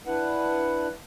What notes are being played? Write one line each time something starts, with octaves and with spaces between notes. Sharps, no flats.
D4 E4 B4 F#5